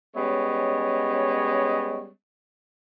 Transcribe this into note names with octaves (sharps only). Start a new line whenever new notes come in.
G3 G#3 B3 C#4 C#5 D#5